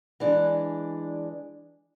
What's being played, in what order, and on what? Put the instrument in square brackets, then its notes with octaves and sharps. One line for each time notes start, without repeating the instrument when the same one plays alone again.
[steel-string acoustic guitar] E3 G#3 D4